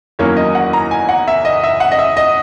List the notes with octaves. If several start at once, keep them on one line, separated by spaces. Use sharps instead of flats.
E2 D#3 F#3 A#3 C#4 C#5
D#5
F#5
A#5
G#5
F#5
E5
D#5
E5
F#5
D#5
E5
D#5